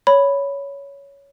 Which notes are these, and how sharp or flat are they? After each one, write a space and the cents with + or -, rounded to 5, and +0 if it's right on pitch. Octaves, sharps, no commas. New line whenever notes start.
C#5 +10 B5 +0